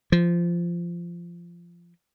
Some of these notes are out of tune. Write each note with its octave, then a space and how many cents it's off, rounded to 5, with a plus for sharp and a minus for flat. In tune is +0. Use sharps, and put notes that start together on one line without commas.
F3 -20